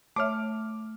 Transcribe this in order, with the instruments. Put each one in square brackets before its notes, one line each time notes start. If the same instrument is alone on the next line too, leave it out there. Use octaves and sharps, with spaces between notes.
[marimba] A3 C#5 E5 [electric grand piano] D6 F6